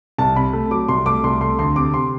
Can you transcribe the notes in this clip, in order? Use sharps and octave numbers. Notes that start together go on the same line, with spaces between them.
C2 A5
C3 B5
A3
F#3 D6
C2 C6
A3 D6
C2 C6
A3 C6
D2 C6
C3 D6
C3 C6